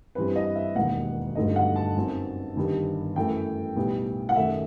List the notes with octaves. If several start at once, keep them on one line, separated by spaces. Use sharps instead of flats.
G2 E3 G3 C4 B4
D#5
E5
E1 D#2 D#3 F#5
G1 G2 F#3 A3 D#4 D#5
F#5
A5
F#2 F#3 C4 D#4
G1 G2 D#3 G3
F#2 E3 A3 G5
B1 A2 G3 B3
F#5
F#2 D#3 A3 E5